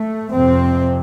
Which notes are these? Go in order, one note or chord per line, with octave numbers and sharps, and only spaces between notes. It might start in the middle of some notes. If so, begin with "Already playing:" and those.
Already playing: A3
F2 C3 C4